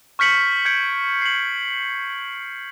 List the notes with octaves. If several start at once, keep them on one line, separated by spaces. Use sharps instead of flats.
C#6 F6 G6 B6 C#7 F#7
G6 G#6 C#7 D7
C7 F#7